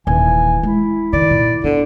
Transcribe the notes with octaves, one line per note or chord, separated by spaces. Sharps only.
D#1 E3 G#5
G#3 E4
D#3 D5
A#2
D3 B3